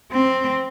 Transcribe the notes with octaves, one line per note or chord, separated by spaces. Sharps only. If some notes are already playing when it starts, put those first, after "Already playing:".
C4